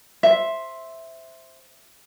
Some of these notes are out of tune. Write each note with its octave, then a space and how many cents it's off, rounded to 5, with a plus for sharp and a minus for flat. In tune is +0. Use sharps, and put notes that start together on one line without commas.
C5 +5 E5 +0